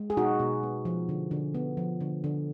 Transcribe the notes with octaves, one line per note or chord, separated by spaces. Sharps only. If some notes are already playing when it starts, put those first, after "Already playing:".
Already playing: G#3
G#4
B2 D#4 F#4
B2
B3
F3
D3
D3
B3
F3
D3
D3